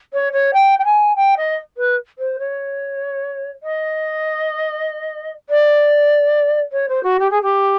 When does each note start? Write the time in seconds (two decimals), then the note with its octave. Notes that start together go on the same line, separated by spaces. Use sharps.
0.13 C#5
0.32 C#5
0.53 G5
0.78 G5
0.84 G#5
1.16 G5
1.36 D#5
1.77 B4
2.18 C5
2.39 C#5
3.63 D#5
5.49 D5
6.72 C#5
6.88 C5
7.03 F#4
7.19 G4
7.30 G#4
7.42 G4